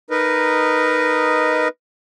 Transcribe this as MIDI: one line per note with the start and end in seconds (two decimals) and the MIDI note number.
0.10 1.68 63
0.10 1.68 70
0.10 1.68 71
0.10 1.68 75